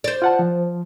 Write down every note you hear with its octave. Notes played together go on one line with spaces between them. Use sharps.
C5 D5
F4 F#5 A5
F3